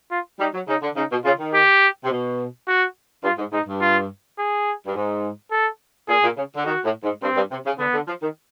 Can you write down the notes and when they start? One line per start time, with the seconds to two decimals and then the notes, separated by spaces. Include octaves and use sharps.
0.11 F4
0.40 G3 D#4
0.54 F#3
0.68 C#3 D#4
0.82 D3
0.96 C#3 D#4
1.11 B2
1.25 C#3 F4
1.39 D#3
1.54 G4
2.04 C3
2.11 B2
2.67 F#4
3.24 G2 F4
3.38 G#2
3.53 G#2 D#4
3.67 G2
3.81 F4
4.39 G#4
4.86 G2
4.95 G#2
5.51 A4
6.08 A#2 G#4
6.23 A#2
6.37 C#3
6.56 D3
6.65 D#3 F#4
6.85 A2
7.03 G#2
7.22 G2 C4
7.36 G2
7.52 C3
7.65 C#3
7.79 D3 B3
7.94 D3
8.08 F3
8.22 D#3